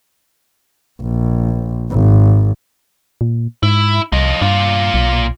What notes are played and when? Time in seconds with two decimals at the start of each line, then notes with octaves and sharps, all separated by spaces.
1.02 A#1
1.91 G#1
3.21 A#2
3.63 G#2 E4
4.12 C2 F3 D#5
4.42 G2 A#2 F4
4.94 B1